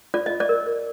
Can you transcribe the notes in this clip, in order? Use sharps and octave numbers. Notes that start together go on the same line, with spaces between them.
F4 D5
F4 D#5
D5
A#4
A#4